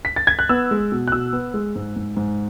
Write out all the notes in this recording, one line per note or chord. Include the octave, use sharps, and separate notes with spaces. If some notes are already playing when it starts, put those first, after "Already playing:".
B6
A6
G#6
F#6
B3 E6
G#3
B2
F#6
B2 E6
B3
G#3
G#2
G#2
G#2